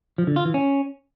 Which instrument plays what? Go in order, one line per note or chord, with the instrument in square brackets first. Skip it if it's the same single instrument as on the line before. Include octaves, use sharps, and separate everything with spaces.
[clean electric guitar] F3
D3
F4
E3
C#4